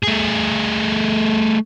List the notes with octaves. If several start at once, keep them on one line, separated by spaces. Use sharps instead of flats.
A3 G#4